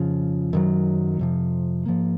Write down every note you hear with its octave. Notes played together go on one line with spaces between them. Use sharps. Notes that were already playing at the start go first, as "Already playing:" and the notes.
Already playing: F2 C#3 F3
F#2 D#3 F#3
F2 C3 F3
G#2 F3 A#3